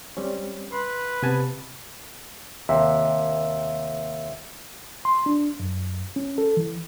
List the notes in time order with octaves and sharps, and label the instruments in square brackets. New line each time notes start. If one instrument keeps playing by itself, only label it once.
[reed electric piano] G3 C4 C#4
[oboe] B4 [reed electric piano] C6
[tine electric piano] C3 [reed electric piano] B3 G#5 A5
[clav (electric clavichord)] D#2 C3 [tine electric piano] E5
[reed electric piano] C6
D4
F#2
C#4
A4
E3